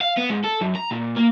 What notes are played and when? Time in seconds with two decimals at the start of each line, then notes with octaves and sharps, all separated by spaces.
0.01 F5
0.17 B3
0.30 G#2
0.44 A4
0.61 F#2
0.75 A#5
0.91 A#2
1.16 A#3